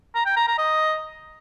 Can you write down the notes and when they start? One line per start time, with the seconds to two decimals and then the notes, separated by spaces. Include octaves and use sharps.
0.15 A#5
0.26 G5
0.36 A#5
0.47 A#5
0.58 D#5